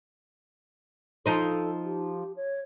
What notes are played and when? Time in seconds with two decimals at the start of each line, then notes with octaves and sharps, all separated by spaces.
1.26 F3 D#4 A4 C5
1.85 G4
2.36 C#5